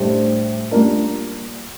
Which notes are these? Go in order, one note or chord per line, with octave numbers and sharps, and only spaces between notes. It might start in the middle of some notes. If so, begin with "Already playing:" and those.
Already playing: A2 G3 D4 G4 C5
G3 A#3 D4 F4 A#4